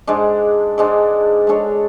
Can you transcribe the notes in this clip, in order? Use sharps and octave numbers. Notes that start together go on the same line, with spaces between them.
G#2 G#3 D4
G#2 G#3 D4
G#3 D4 A4 C#5